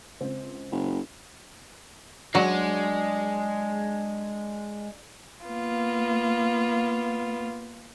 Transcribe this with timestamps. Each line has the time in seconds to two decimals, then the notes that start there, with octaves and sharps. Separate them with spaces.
0.20 C#2 C4
0.72 F#1
2.35 F#3 G#3 D4
5.47 A#3 B3 F4